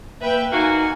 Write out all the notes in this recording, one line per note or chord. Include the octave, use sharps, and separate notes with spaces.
A#3 B4 E5 G5
A#3 D#4 F#4 G#5